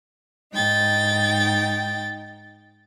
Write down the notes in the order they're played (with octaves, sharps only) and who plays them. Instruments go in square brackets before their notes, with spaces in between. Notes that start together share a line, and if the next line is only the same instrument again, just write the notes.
[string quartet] G#2 D#4 G5 A6